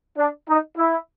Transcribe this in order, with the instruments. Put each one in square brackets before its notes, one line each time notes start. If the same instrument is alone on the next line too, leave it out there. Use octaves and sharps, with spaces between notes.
[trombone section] D4
D#4
E4